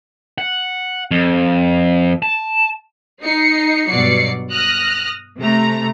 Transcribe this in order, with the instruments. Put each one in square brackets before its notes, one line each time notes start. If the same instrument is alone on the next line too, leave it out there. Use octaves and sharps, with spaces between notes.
[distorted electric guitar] F#5
F2
A5
[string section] D#4 C7 C#7
G2 B2 F#3 D5 C7 C#7
D#6 F6 F#6 A#6
C3 A3 A#5